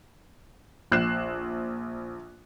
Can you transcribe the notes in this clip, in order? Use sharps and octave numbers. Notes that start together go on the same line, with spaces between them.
A#1 F#6 C7 E7